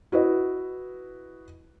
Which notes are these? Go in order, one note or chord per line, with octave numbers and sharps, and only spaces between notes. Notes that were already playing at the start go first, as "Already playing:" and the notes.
E4 F#4 B4 D#5